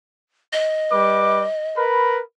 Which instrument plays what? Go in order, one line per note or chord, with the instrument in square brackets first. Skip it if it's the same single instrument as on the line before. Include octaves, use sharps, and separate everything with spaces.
[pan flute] D#5
[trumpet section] G3 B4 D6
A#4 B4 B5